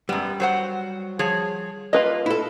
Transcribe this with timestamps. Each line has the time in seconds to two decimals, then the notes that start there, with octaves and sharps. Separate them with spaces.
0.09 F#2 G3 B3
0.40 F#3 C5 F#5
1.19 F3 G#4 C#5
1.93 A#3 F4 B4 D#5
2.26 E4 A4